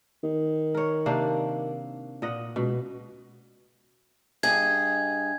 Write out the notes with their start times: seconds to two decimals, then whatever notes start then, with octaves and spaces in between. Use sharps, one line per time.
0.23 D#3
0.74 A#4 C#5
1.06 C3 A#3 D4
2.22 A#2 D#5 F#5
2.56 C#2 B2
4.43 G2 G#4 D#5 G#6